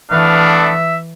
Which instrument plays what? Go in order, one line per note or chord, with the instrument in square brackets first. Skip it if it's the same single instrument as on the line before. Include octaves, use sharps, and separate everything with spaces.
[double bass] E3 [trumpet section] A3 B3 D4 [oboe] F5
[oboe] E5